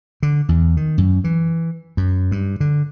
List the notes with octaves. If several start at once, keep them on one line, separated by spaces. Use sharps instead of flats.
D3
E2
D#3
F#2
E3
F#2
G2
D3